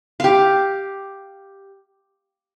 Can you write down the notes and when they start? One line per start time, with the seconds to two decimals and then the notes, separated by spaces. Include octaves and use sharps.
0.20 G4 F5